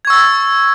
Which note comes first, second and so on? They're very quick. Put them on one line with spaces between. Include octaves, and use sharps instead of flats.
G#6 C#6 E6 A6